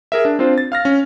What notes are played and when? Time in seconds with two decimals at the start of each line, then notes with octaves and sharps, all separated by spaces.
0.12 G#4 A#4 E5
0.25 D4
0.39 C4 D4 F4 C5
0.58 A6
0.72 F5 F6 A#6
0.85 C#4